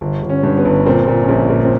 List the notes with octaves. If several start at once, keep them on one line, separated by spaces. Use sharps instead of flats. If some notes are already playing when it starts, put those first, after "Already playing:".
G1
G1
C#4
G2
B3
G1
A#2 C4
A#2
C#4
A#1 C4
A#2
C4